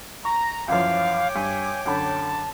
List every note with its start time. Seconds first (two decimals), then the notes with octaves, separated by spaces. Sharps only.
0.25 A#5 C#6
0.68 F#2 E3 F3 C#5 F5 G5 D6
1.35 G2 G#5
1.86 F#2 D3 A5 B5